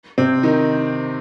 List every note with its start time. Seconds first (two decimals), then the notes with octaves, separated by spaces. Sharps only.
0.18 C3 C4
0.43 D#3 D#4